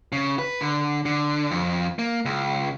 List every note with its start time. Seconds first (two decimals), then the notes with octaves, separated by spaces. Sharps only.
0.12 C#3
0.39 B4
0.61 D3
1.05 D3
1.51 F2
1.99 A#3
2.25 C#2